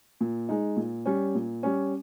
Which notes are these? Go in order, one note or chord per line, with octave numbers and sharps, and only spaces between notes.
A#2
G#3 D#4
A#2
G3 C#4
A#2
G3 C#4